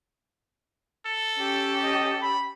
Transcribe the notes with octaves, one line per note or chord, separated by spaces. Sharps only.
A4
C#4 G4
D#5
B5